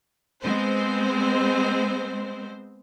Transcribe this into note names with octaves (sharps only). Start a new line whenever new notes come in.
G#3 B3 C4 C5